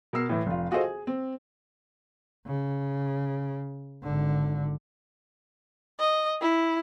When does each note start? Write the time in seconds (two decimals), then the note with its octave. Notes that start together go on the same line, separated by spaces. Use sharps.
0.13 B2 A#4 E6 C7
0.29 A2 E3
0.46 F1 F4
0.71 F4 F#4 G#4 A4 C5 D#5
0.83 G#4
1.07 C4
2.47 C#3
4.03 G#1 D3
5.99 D#5
6.41 E4